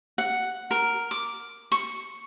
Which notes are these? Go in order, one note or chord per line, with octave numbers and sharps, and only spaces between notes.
F#5
A#4
D6
C#6